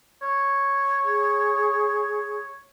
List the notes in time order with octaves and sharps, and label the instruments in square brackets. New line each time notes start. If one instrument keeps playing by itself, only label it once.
[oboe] C#5
[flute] G#4